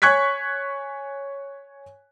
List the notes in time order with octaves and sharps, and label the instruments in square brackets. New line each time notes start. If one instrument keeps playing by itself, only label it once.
[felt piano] C#5 G#5 C#6 F#6 G#6 B6